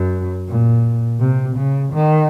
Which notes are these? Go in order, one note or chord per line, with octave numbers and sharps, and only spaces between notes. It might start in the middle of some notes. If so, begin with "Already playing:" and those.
Already playing: F#2
A#2
C3
C#3
D#3